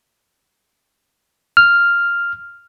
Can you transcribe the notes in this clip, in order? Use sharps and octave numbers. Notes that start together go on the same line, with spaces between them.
F6